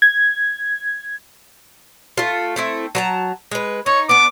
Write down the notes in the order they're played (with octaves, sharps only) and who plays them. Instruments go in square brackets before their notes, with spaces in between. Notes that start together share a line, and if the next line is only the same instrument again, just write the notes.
[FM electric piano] G#6
[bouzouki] A3 F4
A3 C4 E4
F#3 A5 A#5
G#3 B4
[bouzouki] D#4 [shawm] C#5
[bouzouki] B3 D4 [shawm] D6